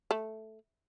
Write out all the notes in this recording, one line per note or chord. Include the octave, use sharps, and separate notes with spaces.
A3